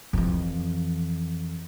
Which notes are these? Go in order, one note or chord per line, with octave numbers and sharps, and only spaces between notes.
F2 E3